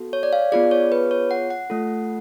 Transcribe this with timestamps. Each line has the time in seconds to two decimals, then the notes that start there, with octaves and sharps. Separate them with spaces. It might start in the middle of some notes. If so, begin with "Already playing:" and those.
Already playing: B3 F#4 A4
0.13 C#5
0.23 D5
0.33 F5
0.52 B3 F4 G#4 D5
0.71 C#5
0.92 B4
1.11 C#5
1.31 F#5
1.51 F#5
1.70 A3 F4 A4